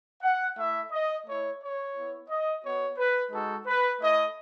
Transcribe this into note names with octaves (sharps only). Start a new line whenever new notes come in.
F#5
A3 E4 E5
D#5
A3 E4 C#5
C#5
B3 E4
D#5
B3 F#4 C#5
B4
G#3 D#4 F#4 A4
B4
A3 E4 D#5